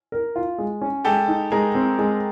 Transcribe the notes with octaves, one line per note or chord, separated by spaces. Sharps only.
A#4
F4
G#3
C#4
G#3 G4 A4
D#4
G#3 G#4 A#4
C4
G#3